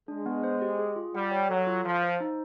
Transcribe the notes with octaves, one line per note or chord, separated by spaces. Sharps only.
G#3 D4
B3
C5
G4
G#4
F4
G3 F#5
C#5
F#3 A4
F4
F3 F5
C5
D#4